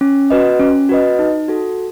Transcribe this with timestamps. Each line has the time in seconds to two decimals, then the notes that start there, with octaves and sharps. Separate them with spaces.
0.01 C#4
0.30 F#4 B4 D#5
0.60 C#4
0.89 F#4 B4 D#5
1.19 D#4
1.48 F#4 A4